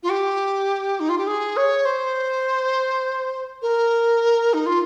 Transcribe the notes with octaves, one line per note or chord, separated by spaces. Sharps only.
F4
G4
D#4
F4
G4
G#4
C#5
C5
A#4
D#4
F4